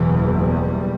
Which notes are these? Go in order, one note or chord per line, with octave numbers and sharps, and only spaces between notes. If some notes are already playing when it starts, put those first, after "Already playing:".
Already playing: F#1 E2 B2 E3
G3